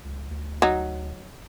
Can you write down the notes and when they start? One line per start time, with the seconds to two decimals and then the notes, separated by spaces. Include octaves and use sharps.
0.04 C#2
0.30 D2
0.62 F#3 D#4